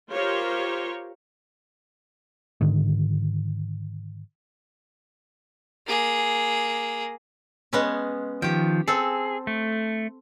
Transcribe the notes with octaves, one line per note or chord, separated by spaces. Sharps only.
F4 G4 A#4 C5 C#5
G#2 D3 D#3
A#3 G#4
G#3 B3 C#4
D#3 F3 G4 G5
C4 G#4 A4
A3